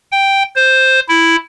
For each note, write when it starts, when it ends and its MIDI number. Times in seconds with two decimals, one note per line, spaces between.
0.12 0.43 79
0.56 1.00 72
1.09 1.36 64